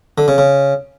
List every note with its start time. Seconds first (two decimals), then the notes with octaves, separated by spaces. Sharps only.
0.18 D3
0.28 C#3
0.38 C#3